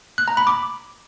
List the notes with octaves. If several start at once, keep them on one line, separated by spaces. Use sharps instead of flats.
F#6
A#5
B5
D6